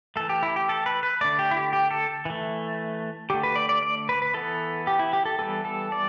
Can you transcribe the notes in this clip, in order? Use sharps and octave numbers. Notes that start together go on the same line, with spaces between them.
E3 A3 A4
G4
E4
G4
A4
B4
B4
D3 A3 D5
G4
E4
G4
G4
A4
E3 A3
D3 A3 G4
B4
D5
D5
D5
B4
B4
E3 B3 A4
G4
E4
G4
A4
E3 G3 B3 A4
A4
D5